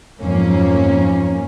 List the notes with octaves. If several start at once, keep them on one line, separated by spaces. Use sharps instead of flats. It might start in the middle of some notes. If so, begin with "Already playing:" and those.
F2 G#2 F#3 A#3 C#4